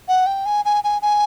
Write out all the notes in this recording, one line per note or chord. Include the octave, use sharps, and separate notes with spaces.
F#5
G5
G#5
G#5
G#5
G#5